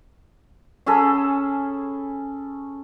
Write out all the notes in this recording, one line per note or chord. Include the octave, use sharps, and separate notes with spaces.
C#4 G#4 A4 B5